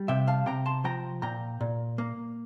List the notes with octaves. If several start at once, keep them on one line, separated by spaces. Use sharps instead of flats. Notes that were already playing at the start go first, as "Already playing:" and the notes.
Already playing: G3
C3 E5 G5
F5 A5
C3 G5 A#5
A5 C6
F3 G5 A#5
A#2 G5 A#5
A#2
A#3